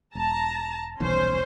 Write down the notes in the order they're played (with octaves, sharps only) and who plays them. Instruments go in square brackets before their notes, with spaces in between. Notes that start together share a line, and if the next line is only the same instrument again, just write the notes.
[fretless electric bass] E1 [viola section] A5 A#5
[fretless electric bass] D#1 B1 E3 [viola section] C#4 C5